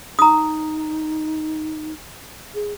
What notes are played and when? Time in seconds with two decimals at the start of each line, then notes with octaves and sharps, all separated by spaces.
0.19 D#4 A#5 D#6
2.55 G#4